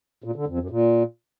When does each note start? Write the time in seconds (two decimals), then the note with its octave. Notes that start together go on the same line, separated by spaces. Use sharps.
0.24 A#2
0.36 D3
0.47 F2
0.59 F#2
0.70 A#2